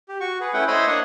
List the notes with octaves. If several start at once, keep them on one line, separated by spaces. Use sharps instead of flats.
G4
F#4 C#6
G#4 B4
A3 C#4 E4 B4 F#5 G5
E4 C5 C#5 D#5 B5 C6
A#3 D4 C#5 D#5 F#5